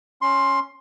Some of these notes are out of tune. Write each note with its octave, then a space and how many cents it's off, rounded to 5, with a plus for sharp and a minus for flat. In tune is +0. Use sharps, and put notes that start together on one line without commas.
C#4 +0 C6 +15